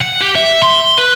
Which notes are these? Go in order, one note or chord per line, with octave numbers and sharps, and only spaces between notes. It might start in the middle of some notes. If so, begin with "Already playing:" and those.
F#5
G4
E5
C6
B4